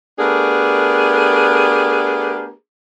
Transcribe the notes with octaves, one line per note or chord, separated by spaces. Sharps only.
A3 B3 D4 G4 G#4 A#4